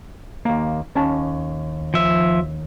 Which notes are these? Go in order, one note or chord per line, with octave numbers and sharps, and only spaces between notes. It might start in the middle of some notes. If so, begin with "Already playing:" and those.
D#2 A#3
D#2 C#4 A5
F3 E5